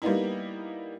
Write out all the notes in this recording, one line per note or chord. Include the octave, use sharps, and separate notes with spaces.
G3 A#3 B3 D#4 E4